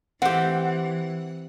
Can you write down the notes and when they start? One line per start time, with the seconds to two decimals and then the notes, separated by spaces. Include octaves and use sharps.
0.22 E3 C4 G4 F#5